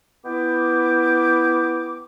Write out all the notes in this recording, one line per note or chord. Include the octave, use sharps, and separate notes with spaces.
B3 E4 G5 D6